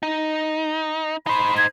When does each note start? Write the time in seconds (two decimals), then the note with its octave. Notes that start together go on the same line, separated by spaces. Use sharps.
0.03 D#4
1.27 D#4 C5 B5
1.57 G#6